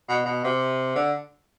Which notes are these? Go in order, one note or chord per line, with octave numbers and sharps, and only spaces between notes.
B2
B2
C3
D3